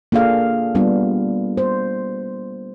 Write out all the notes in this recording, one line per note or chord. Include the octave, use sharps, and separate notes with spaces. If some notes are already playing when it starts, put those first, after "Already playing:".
A#3 D4 F4 G#4 A4 F5
G3 B3 D4 F4
C5